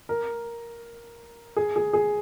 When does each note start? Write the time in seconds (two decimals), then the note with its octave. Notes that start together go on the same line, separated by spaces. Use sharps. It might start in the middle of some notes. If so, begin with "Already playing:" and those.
0.09 A#4
1.56 G#4
1.76 G#4
1.93 G#4